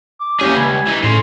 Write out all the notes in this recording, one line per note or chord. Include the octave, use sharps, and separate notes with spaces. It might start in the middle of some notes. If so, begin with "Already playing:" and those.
D6
D#2 E3 G3 C#4 G4 G#4
C#2 G#5 B5
E3 D#4
A2 C#3 C6